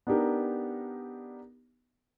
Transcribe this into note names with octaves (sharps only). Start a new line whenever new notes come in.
B3 D4 D#4 G4 A#4